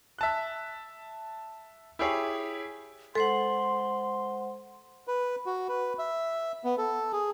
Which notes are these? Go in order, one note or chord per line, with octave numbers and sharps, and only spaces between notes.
E5 A5 F#6
E4 G4 G#4 C#5
G#3 A4 C5 F#5 C6
B4
F#4
B4
E5
B3
A4
G#4